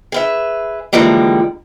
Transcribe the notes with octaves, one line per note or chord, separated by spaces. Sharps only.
G#4 B4 E5
D3 E3 F3 G3 G#3 A#3